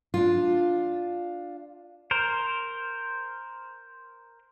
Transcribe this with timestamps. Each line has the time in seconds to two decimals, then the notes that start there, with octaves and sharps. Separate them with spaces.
0.14 D4 F4
2.11 A#4 C5